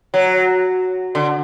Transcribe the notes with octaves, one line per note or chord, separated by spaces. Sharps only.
F#3
D3